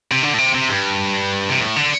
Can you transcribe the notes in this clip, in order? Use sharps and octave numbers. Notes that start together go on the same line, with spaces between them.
C3
D3
A2
C3
C3
G2
C3
A2
D3